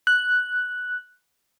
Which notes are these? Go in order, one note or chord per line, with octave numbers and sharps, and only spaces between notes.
F#6